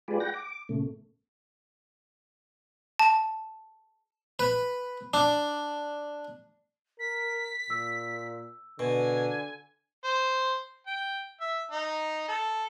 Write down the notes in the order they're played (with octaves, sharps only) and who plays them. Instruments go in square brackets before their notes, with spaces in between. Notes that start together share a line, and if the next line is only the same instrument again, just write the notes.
[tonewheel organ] G#3 F4 G4 G#4 B4 D5
F#5 G5 A#6
D6
A#2 C#3 A3
[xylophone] A5
[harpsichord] B4
D4
[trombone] A#4 [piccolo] B6
[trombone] A#2 [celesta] E6
[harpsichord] B2 [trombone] D3 [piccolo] G#5
[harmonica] C5
G5
E5
D#4
A4